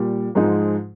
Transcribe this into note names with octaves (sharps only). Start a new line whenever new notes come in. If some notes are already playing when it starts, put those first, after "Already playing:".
Already playing: A#2 G3
G#2 F3 G#3 D#4